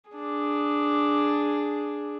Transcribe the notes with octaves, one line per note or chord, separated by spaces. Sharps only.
D4 G#4